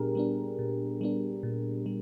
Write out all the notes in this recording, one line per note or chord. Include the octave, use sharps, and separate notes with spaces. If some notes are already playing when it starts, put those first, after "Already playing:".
Already playing: A#2 G3 B3 D4 G4 G#4 A#4
G3 B3 D4
A#2
G3 B3 D4
A#2
G3